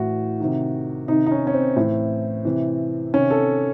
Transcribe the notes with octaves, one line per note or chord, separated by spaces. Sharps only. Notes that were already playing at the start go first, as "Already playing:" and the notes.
Already playing: A2 E3 F#4
C3 D#3
C3 D#3 D#4
D#4
C#4
C#4
C4
A2 E3
C3 E3
C3 D#3 C#4
A4